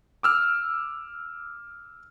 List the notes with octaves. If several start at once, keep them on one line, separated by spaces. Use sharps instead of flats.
D6 E6 F6